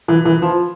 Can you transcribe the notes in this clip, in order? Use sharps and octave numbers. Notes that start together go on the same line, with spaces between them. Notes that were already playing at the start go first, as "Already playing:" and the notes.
E3
E3
F3